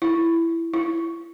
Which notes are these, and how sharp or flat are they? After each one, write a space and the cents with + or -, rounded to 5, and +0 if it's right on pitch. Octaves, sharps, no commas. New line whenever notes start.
E4 +15
E4 +25